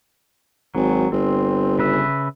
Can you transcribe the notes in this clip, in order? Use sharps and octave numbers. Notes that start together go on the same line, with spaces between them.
G#1 F#3
G1 C4
C#3 B4 E5